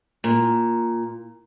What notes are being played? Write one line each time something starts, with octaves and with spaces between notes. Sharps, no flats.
A#2